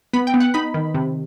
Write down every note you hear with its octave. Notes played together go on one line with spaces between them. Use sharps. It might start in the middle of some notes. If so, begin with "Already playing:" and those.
B3 B5
G5
B3
F#5
D#4 B5
D#3
C3